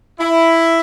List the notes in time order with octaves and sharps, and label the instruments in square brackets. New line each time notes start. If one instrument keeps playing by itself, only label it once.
[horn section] E4